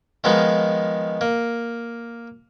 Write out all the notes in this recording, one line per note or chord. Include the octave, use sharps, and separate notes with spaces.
D#3 F3 G#3 B3 D#4
A#3